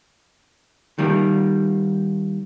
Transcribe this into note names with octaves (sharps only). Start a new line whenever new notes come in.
D#3 G3 A#3